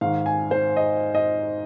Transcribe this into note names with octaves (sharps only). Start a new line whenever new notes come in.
G#2 D#3 F5
G#5
C5
D#5
D#5